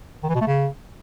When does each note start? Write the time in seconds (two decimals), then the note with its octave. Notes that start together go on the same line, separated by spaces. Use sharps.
0.23 D#3
0.29 E3
0.35 B2
0.41 A3
0.47 C#3